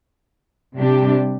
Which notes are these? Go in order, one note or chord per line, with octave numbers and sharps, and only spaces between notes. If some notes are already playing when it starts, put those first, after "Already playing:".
C3 G3 D4 G4